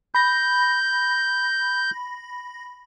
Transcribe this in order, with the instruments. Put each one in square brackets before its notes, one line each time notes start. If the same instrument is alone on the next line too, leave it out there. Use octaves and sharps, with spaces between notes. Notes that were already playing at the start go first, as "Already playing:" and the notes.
[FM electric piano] B5 A#6 [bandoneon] G6